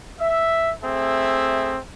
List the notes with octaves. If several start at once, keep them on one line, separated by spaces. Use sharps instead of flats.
E5
A3 C4 G#4 E5